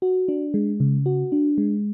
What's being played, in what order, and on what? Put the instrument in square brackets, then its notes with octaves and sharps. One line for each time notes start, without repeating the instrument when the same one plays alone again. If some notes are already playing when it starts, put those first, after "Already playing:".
[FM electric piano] F#4
D4
G#3
C#3
F#4
D4
G#3